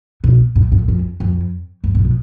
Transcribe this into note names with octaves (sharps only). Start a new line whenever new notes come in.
B2
A2
A2
F2
F2
G2
A2
B2